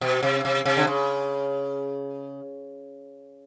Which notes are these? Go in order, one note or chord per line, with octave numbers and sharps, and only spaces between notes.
B2
C3
C3
C3
D3
C#3